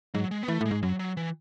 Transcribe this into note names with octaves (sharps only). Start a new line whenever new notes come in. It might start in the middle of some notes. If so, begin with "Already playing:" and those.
G#2 F#3
G#3
B3
E3 A3
A2 G#3
G#2
F#2 F#3
F#3
E3